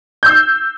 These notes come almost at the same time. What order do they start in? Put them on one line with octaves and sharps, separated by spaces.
G6 E6 C7